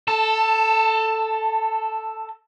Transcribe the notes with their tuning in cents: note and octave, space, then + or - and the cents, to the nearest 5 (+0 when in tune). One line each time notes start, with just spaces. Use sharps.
A4 +0 A5 +20